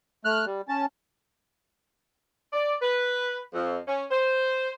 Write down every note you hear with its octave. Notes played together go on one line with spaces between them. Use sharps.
A3 F6 F#6
G3
C#4 A5
D5
B4
F2
C#4
C5